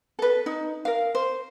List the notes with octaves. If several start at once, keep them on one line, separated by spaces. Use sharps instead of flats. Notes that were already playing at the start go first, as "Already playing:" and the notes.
A4 B4
D#4
A#4 F5
C5